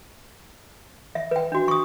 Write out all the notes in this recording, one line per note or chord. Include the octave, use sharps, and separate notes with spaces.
E5
B4 G5
D4 F#4
C#6 D#6